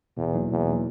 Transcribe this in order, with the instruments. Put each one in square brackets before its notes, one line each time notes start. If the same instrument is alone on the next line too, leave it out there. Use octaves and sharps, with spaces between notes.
[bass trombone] E2 [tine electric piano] B2
[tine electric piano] F#3 A#3 D#4
[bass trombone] E2 [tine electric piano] B2
[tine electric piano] F#3 A#3 D#4